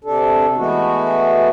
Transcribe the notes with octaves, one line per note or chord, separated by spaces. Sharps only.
C3 D4 A4
E3 G#3 A3 B3 F#4